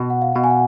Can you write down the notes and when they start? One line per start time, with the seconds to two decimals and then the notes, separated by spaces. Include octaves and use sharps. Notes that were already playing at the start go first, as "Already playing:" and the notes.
Already playing: B2
0.10 F#5
0.22 F5
0.36 B2
0.44 G#5
0.50 F#5